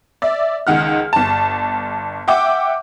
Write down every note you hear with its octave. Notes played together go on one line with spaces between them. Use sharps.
D5 E5
C#2 D#3 F#5 F6
G1 A5
E5 F#5 G5 D6